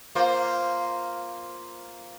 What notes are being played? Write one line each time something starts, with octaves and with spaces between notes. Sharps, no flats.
A#3 F4 C5